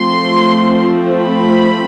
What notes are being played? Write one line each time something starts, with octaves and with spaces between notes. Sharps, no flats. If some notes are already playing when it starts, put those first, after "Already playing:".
Already playing: F3 A3 C4 C6
B5